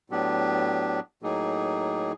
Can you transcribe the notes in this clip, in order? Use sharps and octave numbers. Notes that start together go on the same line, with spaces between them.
A2 F#3 B3 D4 G4
A2 F#3 A#3 D#4 G#4